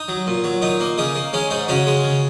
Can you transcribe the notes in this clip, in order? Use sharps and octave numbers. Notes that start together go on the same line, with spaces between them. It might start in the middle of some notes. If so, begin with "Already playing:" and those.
Already playing: D#4
F#3
A#2
F#3
A#2 D#4
A#3
C#3 D#4
A#3
G#3 C#4
G#2 D#4
C#3 C#4 F#4
G#3
C#3